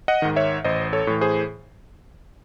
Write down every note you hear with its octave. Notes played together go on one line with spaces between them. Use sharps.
D#5 F#5
G#2 D#3
C#5 E5
A1 C5 D#5
A4 C#5
A2 E3
G#4 C5